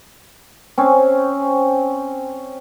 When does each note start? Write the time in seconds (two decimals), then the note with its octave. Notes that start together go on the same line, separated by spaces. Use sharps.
0.78 C4 C#4